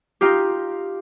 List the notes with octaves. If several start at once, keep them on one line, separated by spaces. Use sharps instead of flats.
D#4 F4 G4